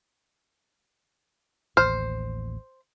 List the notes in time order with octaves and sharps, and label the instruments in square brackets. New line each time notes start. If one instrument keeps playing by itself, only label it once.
[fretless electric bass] A1 D#2 [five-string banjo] C5 [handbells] F6